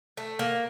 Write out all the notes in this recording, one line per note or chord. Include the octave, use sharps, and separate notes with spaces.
A3
A#3